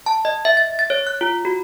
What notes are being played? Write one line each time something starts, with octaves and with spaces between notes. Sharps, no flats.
A5
D#5
E5
A6
A6
C#5
F#6
F4
F#4